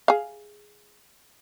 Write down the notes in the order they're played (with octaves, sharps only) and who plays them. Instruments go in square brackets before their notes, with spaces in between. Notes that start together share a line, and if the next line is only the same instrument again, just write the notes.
[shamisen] G#4 F5